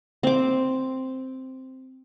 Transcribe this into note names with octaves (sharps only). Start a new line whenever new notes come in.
C4 D6